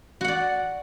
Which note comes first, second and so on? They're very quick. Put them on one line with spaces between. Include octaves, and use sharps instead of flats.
F#4 F#5 D5